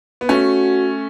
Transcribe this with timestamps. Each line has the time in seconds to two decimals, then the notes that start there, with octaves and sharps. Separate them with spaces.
0.21 B3
0.29 A3 C#4 F#4